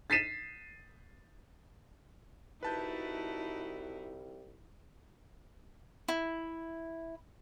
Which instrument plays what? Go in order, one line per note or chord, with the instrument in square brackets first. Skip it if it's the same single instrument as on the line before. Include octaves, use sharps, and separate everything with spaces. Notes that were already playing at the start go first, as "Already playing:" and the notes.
[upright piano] A6 B6 C7 D#7 E7
[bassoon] C2 [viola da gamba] D#4 E4 F#4 [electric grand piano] B4 A5 G6
[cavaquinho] E4